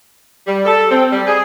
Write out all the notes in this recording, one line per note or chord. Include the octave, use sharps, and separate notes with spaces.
G3
A4
C4
G3
G#4